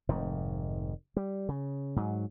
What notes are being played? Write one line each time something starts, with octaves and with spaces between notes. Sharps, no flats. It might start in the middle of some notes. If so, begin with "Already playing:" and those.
F1 G#2 D#3
G3
C#3
G#2 F#3